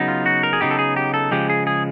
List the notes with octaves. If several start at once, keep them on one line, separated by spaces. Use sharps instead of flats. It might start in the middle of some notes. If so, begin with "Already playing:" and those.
Already playing: C#3 F#3 B3 D#4
F4
F#4
A#4
G#4
C#3 F#3 B3 D#4 G4
A4
G#4
G4
A4
C#3 F3 G#3 G4
G#4
G#4